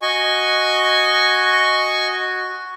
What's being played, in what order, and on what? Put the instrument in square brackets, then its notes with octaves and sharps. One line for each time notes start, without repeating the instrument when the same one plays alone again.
[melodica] F#4 [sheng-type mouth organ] D#5 G#5 C#6